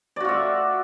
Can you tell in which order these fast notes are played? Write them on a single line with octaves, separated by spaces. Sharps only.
D5 F#4 F4 E5